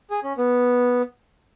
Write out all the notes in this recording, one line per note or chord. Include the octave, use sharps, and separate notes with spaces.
G#4
C#4
B3